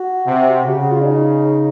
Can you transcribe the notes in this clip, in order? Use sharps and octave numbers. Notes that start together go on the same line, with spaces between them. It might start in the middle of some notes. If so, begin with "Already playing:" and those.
Already playing: F#4
C3
C#3 G4
F#4
F4
D4
D#4